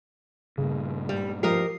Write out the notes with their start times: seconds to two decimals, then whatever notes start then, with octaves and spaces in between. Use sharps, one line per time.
0.58 G2 A#2 C#3
1.09 G3
1.43 F3 G4 A#4 D#5 C7